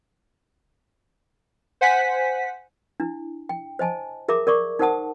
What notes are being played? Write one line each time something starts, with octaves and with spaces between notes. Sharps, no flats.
C5 F#5 G#5 B6
D4 E4
G5
C5 D#5 G#5 A5
G#4 A#4 E5 A#5 D6
A#4 D5 C#6 D6
D#4 A#4 C5 F#5 A5 D#6